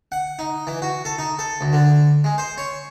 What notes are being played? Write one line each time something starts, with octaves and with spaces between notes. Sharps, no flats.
F#5
D#4
E3
F#4
A4
D#4
A4
D2
D3
G#3
C5
C#5